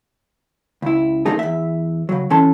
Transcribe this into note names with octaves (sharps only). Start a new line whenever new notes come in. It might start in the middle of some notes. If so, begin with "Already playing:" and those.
C#2 E4
C3 F3 A3 A#3 D#4 G#4
E2 E5
C#3 F#3
E3 C#4 A4 A5 C6